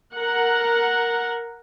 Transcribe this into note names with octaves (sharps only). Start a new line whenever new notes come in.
A#4 F#5